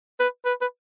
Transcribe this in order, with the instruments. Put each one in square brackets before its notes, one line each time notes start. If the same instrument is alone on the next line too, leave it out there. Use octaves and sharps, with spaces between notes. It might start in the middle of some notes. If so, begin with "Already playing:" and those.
[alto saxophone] B4
B4
B4